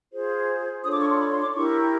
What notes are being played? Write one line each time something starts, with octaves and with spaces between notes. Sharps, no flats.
F4 G#4 C5
D4 F4 A4 C#5 D#6
D6
C#6
C6
B5
C6
D6
E4 G4 A#4 C#6